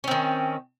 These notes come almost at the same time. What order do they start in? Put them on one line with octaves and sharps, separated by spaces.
C#4 C4 D#3